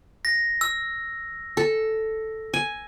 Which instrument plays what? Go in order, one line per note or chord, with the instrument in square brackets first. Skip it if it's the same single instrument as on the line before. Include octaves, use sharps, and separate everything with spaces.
[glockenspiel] A#6
E6
[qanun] A4
G#5